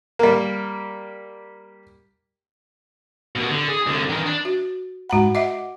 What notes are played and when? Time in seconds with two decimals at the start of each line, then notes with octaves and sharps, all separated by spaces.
0.19 G3 A#3
3.36 D#2 B2
3.51 D3
3.68 G#4
3.86 C2 D3
4.09 D#3 E3
4.26 D4
4.45 F#4
5.09 G#2 F#4 F#5 A#5 B5
5.35 D#5 E5 F#5 D6